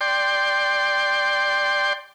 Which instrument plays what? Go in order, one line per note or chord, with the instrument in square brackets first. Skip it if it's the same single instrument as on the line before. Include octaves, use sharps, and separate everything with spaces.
[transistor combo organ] D5 G5 C6